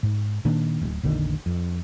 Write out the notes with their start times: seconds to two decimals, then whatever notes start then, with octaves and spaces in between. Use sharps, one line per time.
0.03 G#2
0.45 A#2 D#3 A#3 D4
0.81 D1
1.03 F1 A#1 D3 D#3
1.46 F2